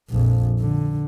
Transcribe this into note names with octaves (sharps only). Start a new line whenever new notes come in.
A#1 F2
D3